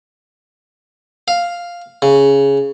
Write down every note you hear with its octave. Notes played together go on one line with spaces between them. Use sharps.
F5
C#3